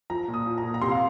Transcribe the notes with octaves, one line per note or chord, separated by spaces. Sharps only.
F3 A#5
A#2
D#6
F3
A#5
A#2
A#5
C3 C6
F5